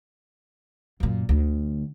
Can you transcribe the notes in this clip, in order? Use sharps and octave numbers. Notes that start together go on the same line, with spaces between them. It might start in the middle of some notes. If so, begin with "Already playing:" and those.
F#2 A#2
D2